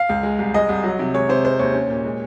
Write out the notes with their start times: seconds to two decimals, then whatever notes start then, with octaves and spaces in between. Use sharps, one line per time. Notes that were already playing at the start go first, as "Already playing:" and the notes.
Already playing: F5
0.09 C#2
0.23 G#3
0.39 C2
0.54 G#3 D#5
0.69 C2
0.83 F#3
0.99 C3
1.14 G#3 C#5
1.29 C3 C5
1.45 G#3 C5
1.59 D#2 C#5
1.74 C#4
1.90 A#2
2.05 G#3